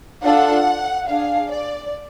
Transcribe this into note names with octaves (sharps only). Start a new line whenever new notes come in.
D4 F4 A4 F#5
D4 G#4 F5
D5